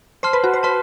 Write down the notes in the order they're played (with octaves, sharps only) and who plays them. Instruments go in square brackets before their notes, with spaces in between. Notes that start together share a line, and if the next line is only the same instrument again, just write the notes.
[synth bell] C5 [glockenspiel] A5 C6 F6
[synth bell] B4
F#4
C5
[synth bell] B4 [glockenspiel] A5 C6 F6